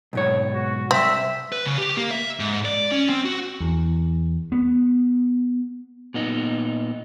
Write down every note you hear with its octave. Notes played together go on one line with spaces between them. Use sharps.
B1 G#2 C#5
F#4
C2 C4 E5
B4
C#3
G4
A#3
E5
G#2
D5
C#4
C4
F#4
E2
B3
A#2 B3 D#4